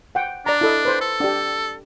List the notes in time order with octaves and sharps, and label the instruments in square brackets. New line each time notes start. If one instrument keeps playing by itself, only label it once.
[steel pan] F#5 G5
[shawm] D4 [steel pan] D5 A#5
[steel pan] E4 A4 D#5
B4 C5
[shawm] A4
[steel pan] D4 G4